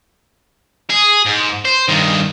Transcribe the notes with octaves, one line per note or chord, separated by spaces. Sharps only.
G#4
G#2
C5
G2 D#3